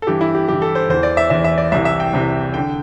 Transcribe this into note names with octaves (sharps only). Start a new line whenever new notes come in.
A4
G2 E3 G4
E4
G4
G2 E3 G4
A4
C5
E2 E3 C5
D5
E5
E2 E3 E5
E5
D5
C2 C3 E3 E5
E5
G5
C2 C3 E3
D3 G5